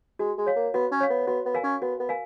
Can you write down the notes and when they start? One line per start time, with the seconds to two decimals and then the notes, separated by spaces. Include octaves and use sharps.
0.19 G#3 F#4
0.38 G#3
0.47 C#5 F5
0.56 A#3
0.74 B3 F#4
0.91 C#4
1.00 C#5 F5
1.10 B3
1.27 B3 F#4
1.45 B3
1.54 A#4 F5 G#5
1.63 C#4
1.82 B3 F#4
2.00 B3
2.09 A#4 F5 G#5